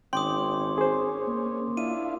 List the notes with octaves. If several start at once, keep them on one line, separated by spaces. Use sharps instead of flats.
G#1 C#4 G5 C6 D6 D#6
G#4 C5
A#3
D4 E4 F4 D#7